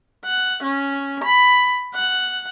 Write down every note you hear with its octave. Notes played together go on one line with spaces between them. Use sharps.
F#5
C#4
B5
F#5